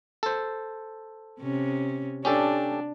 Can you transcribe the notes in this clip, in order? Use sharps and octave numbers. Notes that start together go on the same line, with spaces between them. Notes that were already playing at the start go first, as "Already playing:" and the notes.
A4 C5
C3 C#4
C#4 D4 G4 A4